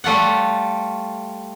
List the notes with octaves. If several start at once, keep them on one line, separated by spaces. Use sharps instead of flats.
G3 A3 F4 F#5